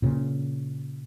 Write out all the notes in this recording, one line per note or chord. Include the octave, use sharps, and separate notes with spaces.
A#2 C#3